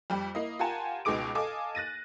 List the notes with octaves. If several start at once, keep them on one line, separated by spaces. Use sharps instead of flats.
F2 G3
A#3 E4 D#5
F4 G4 A#4 F#5 G#5 A5
C#2 B2 D#4 G#4 D6 D7
A4 D#5 F5 G#5 D6
F#6 A6 A#6 D#7